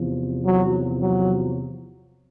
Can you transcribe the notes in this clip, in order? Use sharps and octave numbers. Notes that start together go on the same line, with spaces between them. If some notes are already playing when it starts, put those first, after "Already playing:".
Already playing: E2 C3 F3
F#3
F#3